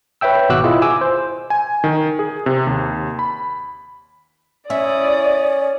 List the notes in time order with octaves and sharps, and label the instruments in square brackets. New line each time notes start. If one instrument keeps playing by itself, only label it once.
[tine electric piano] B4 C#5 E5 G5 E6
G#1 B2 F#4 D6 E6 F#6
E4 F4 G#4 D#5
G#5 D6 E6
C5
[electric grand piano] G#5
D#3
G#4
C3
D#2
B5
[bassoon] C#4 [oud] E4 [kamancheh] D5 D#6